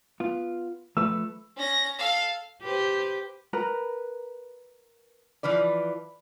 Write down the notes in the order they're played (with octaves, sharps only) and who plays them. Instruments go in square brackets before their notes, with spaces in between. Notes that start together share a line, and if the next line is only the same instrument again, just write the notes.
[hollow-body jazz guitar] B3 F4
[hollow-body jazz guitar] F3 A3 B4 [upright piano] E6
[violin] C#4 A#6
A4 F5
[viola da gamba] G4 B4 C5
[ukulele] A#4 B4 A#5
[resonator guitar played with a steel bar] E3 F3 B4 D5